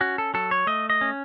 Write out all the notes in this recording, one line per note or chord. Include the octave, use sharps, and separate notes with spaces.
C#4 F#4
A4
F#3 A4
C#5
A3 D#5
D#5
C#4